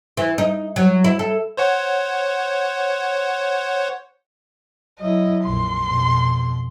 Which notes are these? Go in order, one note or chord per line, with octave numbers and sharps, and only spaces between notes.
E3
D#4
F#3
E4
A4
C5 C#5 F#5
F#3 E4 D#5
A#1 F2 C6
F2 B2